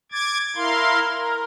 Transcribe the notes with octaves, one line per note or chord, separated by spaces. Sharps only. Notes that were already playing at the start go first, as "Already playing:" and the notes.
D6 G#6 A6
E4 A#4 F5 C6
A#4